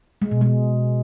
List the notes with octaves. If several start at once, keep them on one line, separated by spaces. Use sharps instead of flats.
G#3
B2
G#3